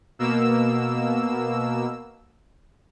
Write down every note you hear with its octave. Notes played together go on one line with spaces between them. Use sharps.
B2 A#3 E6